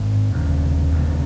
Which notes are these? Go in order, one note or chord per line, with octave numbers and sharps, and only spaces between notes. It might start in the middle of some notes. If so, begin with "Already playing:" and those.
Already playing: G#1 G#2
F1 D#2 C#3
F1 D#2 C#3